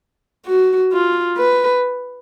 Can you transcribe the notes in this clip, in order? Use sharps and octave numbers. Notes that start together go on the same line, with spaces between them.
F#4
F4
B4